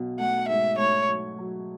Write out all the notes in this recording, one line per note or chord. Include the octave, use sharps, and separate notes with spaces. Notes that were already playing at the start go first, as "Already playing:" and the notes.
Already playing: B1 B2 F#3
A3 F#5
G#2 E5
A3 C#5
F#3
F#3